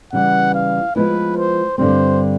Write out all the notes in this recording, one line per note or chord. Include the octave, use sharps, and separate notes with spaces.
C#3 E3 G3 F#5
F5
F3 G#3 B3 E4 B4
C5
G2 D3 G3 C4 C5